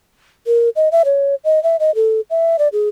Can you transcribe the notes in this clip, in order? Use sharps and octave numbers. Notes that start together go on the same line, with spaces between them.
A#4
D#5
E5
C#5
D#5
E5
D#5
A4
E5
D5
G#4